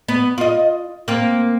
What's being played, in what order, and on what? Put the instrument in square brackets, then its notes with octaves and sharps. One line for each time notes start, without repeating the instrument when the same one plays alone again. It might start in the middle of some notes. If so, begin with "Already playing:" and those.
[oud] B3
F4 D#5
A#3 C4